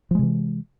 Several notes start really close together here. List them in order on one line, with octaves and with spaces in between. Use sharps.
F3 G#3 C3 E3